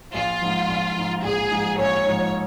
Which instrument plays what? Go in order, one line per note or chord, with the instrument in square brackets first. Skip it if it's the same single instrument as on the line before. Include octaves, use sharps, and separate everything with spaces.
[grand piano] A#1 [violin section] F4
[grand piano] G#2 F3
A#1
G#2 F3
[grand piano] A#1 [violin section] G#4
[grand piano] G#2 F3
[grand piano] A#1 [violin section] C#5
[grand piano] G#2 F3